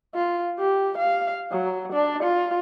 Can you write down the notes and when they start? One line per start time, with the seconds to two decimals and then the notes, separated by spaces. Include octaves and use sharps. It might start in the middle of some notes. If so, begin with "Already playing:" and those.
0.15 F4
0.59 G4
0.98 F5
1.52 F#3
1.93 D4
2.23 F4